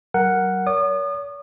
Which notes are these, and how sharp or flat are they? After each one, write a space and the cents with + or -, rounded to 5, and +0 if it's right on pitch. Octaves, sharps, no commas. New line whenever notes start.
F#3 +40 A#4 +0 F#5 +0
C#5 +45 D#6 -40